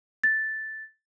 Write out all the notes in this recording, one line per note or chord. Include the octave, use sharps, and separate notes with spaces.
A6